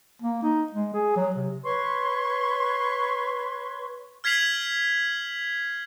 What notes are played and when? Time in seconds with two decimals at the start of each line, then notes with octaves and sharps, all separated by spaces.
0.22 A#3
0.43 D#4
0.72 G#3
0.94 G#4
1.16 F#3
1.36 C3
1.64 B4 C#5 C6 C#6
4.24 F6 G#6 B6 C7 F7 F#7